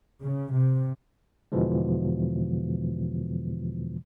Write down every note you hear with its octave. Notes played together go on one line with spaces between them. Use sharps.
C#3
C3
E2 B2 D3 E3 F3 G#3